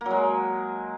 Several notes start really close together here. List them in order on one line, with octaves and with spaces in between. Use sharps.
A#3 F#3 G#3